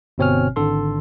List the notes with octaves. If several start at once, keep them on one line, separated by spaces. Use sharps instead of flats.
G1 B2 C4 C#5 G#5 F6
G#1 D3 A4 C6